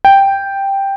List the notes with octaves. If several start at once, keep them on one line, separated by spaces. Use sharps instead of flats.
G5